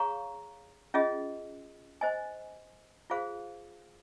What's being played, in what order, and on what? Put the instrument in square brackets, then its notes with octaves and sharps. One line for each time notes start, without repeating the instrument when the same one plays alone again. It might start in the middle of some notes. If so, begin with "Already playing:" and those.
Already playing: [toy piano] G#4 C#5 F5 A#5 C#6
C#4 F4 G#4 D#5
C5 D#5 G#5
F4 G#4 C5 F5